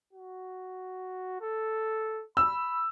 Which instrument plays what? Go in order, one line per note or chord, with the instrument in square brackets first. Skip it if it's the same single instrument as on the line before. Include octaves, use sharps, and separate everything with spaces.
[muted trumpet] F#4
A4
[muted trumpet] B5 [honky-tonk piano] E6